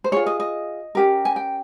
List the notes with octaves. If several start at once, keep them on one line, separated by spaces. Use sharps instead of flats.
C5
F4 G#4 C#5
D#5
D#5
C#4 G4 A#4
G#5
G5